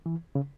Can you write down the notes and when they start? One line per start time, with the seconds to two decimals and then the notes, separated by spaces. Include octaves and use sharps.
0.06 E3
0.35 C#3